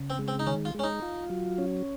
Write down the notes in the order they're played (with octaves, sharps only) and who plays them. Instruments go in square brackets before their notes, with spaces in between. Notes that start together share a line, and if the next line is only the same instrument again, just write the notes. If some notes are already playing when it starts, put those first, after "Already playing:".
Already playing: [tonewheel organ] C#3
[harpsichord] C4
[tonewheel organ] G#3
[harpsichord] C4
D#4
[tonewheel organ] D#3 [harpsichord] C#4
[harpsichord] F4
[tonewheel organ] G#3 [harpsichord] C#4
[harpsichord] D#4
[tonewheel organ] F4
F#3
C#4